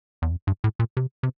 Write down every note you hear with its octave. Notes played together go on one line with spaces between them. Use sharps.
E2
F2
G2
A2
A#2
C3
C3